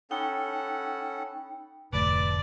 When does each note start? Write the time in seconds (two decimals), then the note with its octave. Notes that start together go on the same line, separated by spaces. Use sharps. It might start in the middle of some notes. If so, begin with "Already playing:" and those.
0.11 C#4 D#4 A4 F#5 G5 B5
1.93 F1 D2 A2 B4 D5 A5